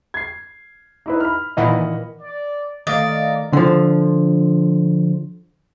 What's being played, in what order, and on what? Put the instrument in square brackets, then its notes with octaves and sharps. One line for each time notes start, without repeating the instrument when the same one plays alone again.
[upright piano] G#6 C7
D#4 E4 B4
B5 F6
[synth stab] A#2 D#3 E3 [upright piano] D#5 F#5 B5
[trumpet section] D5
[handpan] D#3 A3 [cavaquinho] D5 [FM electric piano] D#5 F5 [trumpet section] A#5
[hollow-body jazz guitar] D3 F3